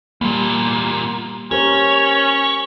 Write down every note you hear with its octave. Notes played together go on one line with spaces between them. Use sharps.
E2 A#2 G3 A#3
C#4 G4 A#4 C5 C#5